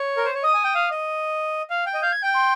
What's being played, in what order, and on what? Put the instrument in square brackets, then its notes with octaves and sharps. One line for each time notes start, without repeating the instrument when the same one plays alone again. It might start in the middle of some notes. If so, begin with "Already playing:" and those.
Already playing: [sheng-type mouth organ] C#5
A#4
C5
C#5
[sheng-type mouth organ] D#5 [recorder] D#6
[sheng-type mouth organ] G#5
G5
F5
D#5
F5
G5
D#5
[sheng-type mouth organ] F5 [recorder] G6
[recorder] G#6
[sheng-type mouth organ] G5 [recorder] G6
[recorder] C6